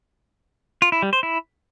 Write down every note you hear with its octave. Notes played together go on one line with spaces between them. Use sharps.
F4
E4
G3
C5
E4